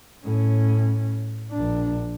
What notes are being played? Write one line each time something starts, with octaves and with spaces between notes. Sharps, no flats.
A2 C#4
A#1 D4